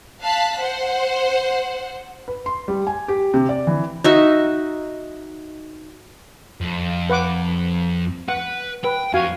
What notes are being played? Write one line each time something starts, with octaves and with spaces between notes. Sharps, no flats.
F5 A5 F#6 B6
C5 F#5
B4
C6
G3
G#5
G4
C3
D5
E3
D#4 F#4 E5
F2
B4 F#5 D6
B4 F#5
B4 G5
F2 F#4 F5 G#5